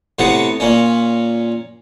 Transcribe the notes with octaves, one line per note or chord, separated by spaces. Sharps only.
A2 C3 B3 F#5
A#2 C#4